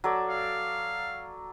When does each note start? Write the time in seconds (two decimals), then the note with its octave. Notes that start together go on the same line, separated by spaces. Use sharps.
0.04 F#3 A4 D5
0.29 F5